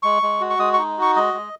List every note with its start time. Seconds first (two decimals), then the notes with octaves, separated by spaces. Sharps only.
0.03 G#3 C#6
0.23 G#3
0.41 F#4
0.50 C#6
0.59 G#3 D#6
0.74 C#6
0.78 D#4
0.97 F#4 C#6
1.16 G#3 D#5
1.34 G#3